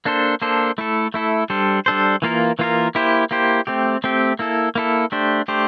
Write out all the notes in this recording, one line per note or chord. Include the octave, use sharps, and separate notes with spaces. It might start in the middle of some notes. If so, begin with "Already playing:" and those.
A#3 D4 A4 C5
A#3 D4 A4 C5
A3 E4 A4
A3 E4 A4
G3 D4 A4 C5
G3 D4 A4 C5
E3 A#3 F4 A#4
E3 A#3 F4 A#4
A#3 E4 G4 C5
A#3 E4 G4 C5
A3 C4 G4
A3 C4 G4
A#3 E4 A4
A#3 E4 A4
A3 D4 G4 C5
A3 D4 G4 C5